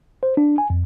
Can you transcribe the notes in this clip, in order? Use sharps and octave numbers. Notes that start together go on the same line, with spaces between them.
C5
D4
G#5
F2